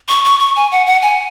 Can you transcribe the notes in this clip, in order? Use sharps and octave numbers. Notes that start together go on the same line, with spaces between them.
C#6
C#6
C#6
G#5
F#5
F#5
G#5